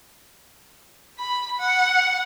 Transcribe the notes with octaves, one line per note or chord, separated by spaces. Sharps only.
B5
F#5